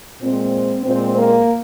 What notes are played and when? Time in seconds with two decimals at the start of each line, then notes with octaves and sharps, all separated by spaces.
0.22 A#2 G#3 C4
0.86 A#2 G#3 C4
1.19 A#3